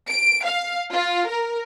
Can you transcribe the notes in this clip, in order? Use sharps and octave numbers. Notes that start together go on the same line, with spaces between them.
D7
F5
F4
A#4